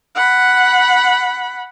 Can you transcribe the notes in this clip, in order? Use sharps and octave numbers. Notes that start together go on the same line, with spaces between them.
F#5 B5